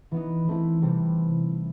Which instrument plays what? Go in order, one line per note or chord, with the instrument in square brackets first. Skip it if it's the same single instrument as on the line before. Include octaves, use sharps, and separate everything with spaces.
[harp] E3 B3 D#4
E3 A3 C4 E4
C3 E3 G3 C4